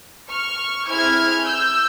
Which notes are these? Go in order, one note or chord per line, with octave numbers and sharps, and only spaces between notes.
C#6 F6
C4 E4 G#4 F6 G#6
E6 G6